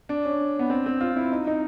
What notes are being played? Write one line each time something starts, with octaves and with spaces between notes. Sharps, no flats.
D4
C#4
B3
C4
C4
F4
E4
D#4
D#4